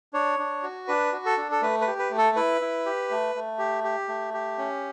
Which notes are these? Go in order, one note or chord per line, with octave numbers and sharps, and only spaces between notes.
D4 C#5
D4
F#4
D4 B4
F#4
A4
D4
A4
A3 B4
B4
G4
B4
A3
A4
E4 B4
E4
G4
A3
A3
G4
G4
A3
G4
C#4